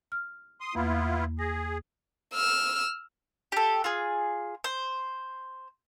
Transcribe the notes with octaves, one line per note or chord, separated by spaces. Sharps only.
F6
C6 D#6
E2 A#3 B3 E4 F4
G#4 A#6
E6 F6
G4 A4
F4 G#4
C5